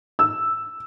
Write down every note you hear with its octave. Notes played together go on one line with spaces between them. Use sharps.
E6